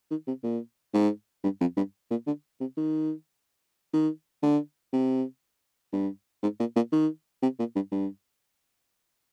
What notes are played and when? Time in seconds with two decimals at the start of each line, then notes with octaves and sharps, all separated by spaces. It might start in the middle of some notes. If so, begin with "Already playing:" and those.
0.11 D#3
0.27 C3
0.44 A#2
0.94 G#2
1.44 G2
1.61 F2
1.77 G2
2.11 A#2
2.27 D3
2.60 C3
2.77 D#3
3.93 D#3
4.43 D3
4.93 C3
5.93 G2
6.43 G#2
6.60 A#2
6.76 A#2
6.92 D#3
7.42 C3
7.59 A#2
7.75 G2
7.92 G2